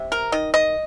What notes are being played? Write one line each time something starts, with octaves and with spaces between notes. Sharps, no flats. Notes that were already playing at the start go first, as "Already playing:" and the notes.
Already playing: C3
A#4
D#3 D#5
D#5